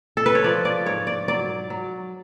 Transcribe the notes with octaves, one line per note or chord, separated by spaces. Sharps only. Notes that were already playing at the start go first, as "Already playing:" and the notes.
A4
B4
C#5
F3 D5
D5
G#2 C#5
D5
F#3 D5
F#3